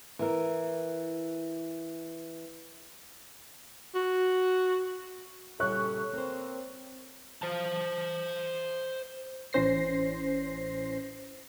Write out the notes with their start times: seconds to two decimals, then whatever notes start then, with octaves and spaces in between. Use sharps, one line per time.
0.19 E3 A#4
3.95 F#4
5.60 A#2 C#3 G3 C#4 A4 C#5 C#6 F#6
6.13 A#3 C4 C5
7.42 C5 A5
9.53 A1 E3 C#4 C5 A#6 C7